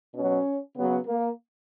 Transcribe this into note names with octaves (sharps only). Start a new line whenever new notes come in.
B2 F#3 C#4
C#3 F#3 B3
A#3